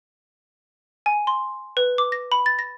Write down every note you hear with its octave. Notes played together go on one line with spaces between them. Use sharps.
G#5
C6
B4
D6
A#6
B5
A6
A#6